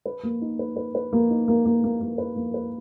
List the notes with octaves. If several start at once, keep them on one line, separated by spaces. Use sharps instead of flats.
B4
A#3
D#4
B4
B4
B4
A#3
D#4
A#3
A#3
A#3
A#3
B4
A#3
B4